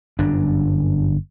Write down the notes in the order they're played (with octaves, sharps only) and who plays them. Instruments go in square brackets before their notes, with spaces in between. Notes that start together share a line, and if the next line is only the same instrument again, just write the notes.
[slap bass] G1 F#2 D4